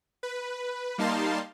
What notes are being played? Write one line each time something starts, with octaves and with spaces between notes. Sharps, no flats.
B4
G3 A#3 D#4 F5 A5 C6